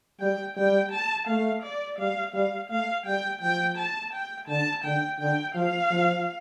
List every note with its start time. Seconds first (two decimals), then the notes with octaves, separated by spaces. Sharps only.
0.20 G3 G5
0.57 G3 G5
0.92 A5
1.27 A3 F5
1.63 D5
1.99 G3 F5
2.34 G3 F5
2.70 A3 F5
3.06 G3 G5
3.41 F3 G5
3.78 A5
4.13 G5
4.48 D3 A5
4.84 D3 G5
5.20 D3 G5
5.55 F3 F5
5.91 F3